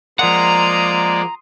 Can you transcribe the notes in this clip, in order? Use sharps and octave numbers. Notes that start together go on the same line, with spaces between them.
F3 G#3 A#3 D5 F#5 A#5 C6 D#6